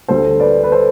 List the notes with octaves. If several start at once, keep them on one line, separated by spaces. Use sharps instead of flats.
D2 D3 G3 A4 C5
B4 D5
B4
A4 C5